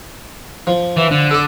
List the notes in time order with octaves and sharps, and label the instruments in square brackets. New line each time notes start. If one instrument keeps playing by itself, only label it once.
[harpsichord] F3
[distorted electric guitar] E3
D3
[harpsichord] A4 D5